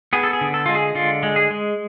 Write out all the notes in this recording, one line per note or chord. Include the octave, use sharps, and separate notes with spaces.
B3 G#4
A4
G#4
D3
A4
G#3 F4
G#4
D3 F4
G#3
G#4
G#3